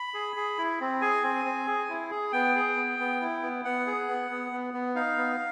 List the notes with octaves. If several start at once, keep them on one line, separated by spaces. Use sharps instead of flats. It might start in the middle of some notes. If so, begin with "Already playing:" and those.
Already playing: B5
G#4
G#4
E4
C4
G#4 G#5
C4
C4
G#4
E4
G#4
B3 G5
G#4
B3
B3
E4
B3
B3 F#5
G#4
B3
B3
B3
B3
D#4 F5
B3